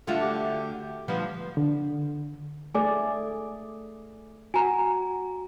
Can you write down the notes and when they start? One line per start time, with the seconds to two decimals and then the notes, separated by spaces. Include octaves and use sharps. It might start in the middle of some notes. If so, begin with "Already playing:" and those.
0.07 D3 A3 F4 F#4
0.21 G4
1.08 D2 F3 G3 B3
1.57 D3
2.75 A3 G#4 D5 G#5 D6
4.54 F#4 G#5 A#5